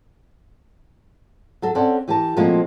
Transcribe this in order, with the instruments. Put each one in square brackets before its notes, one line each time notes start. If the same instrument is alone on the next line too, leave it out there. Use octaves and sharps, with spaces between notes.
[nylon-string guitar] F#3 A4
C4 C#4 A4 D5 F#5
E3 G4 A#4 A5
A#2 F3 G#3 A3 C4 F#4